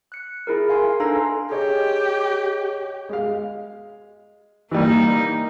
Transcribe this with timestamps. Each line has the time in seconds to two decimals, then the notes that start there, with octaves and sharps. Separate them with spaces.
0.12 F#6 C#7
0.47 E4 G#4 A#4
0.69 F5 G#5 C6
1.00 D4 D#4 A4 B4 F5 A#5
1.51 G4 G#4 C#5 D#5
3.09 G#3 F5
4.71 E3 G3 A#3 D#4